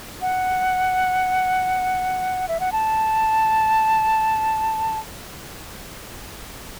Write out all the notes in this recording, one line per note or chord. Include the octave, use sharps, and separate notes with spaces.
F#5
E5
F#5
A5